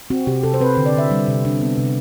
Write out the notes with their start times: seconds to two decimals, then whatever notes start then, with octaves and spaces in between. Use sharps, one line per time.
0.10 C4 F#4
0.27 C3 G4
0.43 C3 A4
0.54 C5
0.61 C4 B4
0.77 D3
0.86 D5
0.94 D3 E5
1.11 G3
1.27 C3
1.45 D4
1.61 B3
1.77 C3